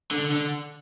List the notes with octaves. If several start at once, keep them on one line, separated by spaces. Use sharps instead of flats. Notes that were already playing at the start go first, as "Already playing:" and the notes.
D3
D3